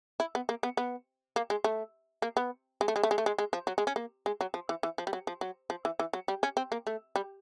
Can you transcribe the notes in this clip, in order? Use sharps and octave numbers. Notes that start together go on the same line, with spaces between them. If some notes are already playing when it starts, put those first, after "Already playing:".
E4
B3
A#3
B3
B3
A#3
G#3
A3
A#3
B3
G#3
A3
G#3
A3
G#3
A3
G#3
G#3
F3
F#3
G#3
C#4
A#3
G#3
F#3
F3
E3
E3
F3
G3
F#3
F3
F#3
F3
E3
E3
F#3
G3
C#4
C4
A#3
A3
G3